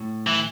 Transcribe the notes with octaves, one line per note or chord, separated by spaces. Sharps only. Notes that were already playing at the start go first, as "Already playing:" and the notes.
Already playing: A2
E3